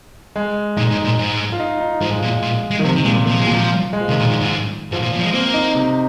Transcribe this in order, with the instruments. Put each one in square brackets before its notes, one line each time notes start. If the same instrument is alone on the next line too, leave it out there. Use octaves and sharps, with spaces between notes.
[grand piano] G#3
[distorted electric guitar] A#2 [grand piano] D#4
[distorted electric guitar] G#2
A#2
G#2
[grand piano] F4
D#4
D#4
[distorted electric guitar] G#2 [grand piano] F3
[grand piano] G#3
[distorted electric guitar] A#2 [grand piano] F3
[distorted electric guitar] A#2
G#3
[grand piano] D#3
[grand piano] C3 [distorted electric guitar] F3
[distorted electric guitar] D#3
[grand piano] A#2 [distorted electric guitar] G#3
[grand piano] A#2 [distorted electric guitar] F3
[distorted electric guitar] G#3
[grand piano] A#2
[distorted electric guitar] F3
[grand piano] G#3
F3
[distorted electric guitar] C3 [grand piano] D#3
[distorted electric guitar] A#2
A#2
G#2
[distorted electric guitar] G#2 [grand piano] F3
[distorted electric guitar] A#2
A#2
F3
G#3
[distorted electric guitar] A#3 [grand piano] C4
[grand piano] D#4
C3